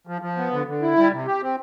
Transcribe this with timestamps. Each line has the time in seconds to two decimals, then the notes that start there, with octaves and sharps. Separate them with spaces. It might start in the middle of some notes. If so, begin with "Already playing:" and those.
0.07 F3
0.22 F3
0.37 B3
0.52 D3
0.67 D3
0.82 E4
0.97 G3
1.12 C3
1.26 G4
1.41 C4